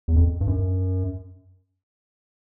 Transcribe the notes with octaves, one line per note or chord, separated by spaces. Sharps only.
E2
F2
G2
F#2